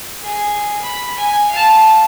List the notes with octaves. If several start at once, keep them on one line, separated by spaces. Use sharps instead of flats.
G#4
B5
G#5
F5 A5